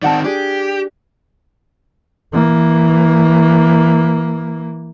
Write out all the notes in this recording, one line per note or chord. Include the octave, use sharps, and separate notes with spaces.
D#3 C4 D5 F#5 A5
D4 G4 G#4
E3 A#3